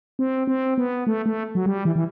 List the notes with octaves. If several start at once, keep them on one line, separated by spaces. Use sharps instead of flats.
C4
C4
B3
A3
A3
F#3
G3
E3
E3